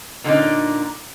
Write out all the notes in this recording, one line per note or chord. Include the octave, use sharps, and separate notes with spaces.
A#2 D3 F#3 B3 C#4 D#4